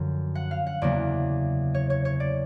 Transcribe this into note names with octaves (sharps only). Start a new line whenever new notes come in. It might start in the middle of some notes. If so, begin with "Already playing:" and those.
Already playing: F#2 D3 F3
F#5
F5
F#5
E2 C#3 F#3 A#3 D5
C#5
C#5
C#5
D5